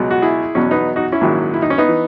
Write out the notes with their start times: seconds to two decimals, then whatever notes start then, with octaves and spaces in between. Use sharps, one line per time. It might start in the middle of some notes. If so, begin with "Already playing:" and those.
Already playing: C#2 B2 F#3
0.11 F#4
0.22 E4 G#4
0.55 E2 B2 F#3 C#4
0.71 B3 D#4
0.96 D#4 F#4
1.12 C#4 E4
1.21 A#1 G#2 D#3 F#3
1.54 E4
1.62 D#4
1.70 C#4
1.78 B3 D#4
1.88 E3